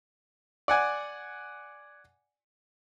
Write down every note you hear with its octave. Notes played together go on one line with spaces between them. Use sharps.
D5 F#5 G#5